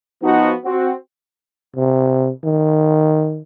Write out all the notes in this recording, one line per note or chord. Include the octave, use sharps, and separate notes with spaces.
F3 B3 D#4 F#4
C4 F#4
C3
D#3